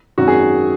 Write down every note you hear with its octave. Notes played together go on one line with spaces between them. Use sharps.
G#1 F#2 D#3 F#4
G#4